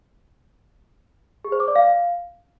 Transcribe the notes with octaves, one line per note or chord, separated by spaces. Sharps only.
G#4
C5
D6
D5
F5